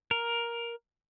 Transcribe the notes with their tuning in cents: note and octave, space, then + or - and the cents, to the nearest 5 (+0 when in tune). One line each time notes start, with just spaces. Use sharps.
A#4 +10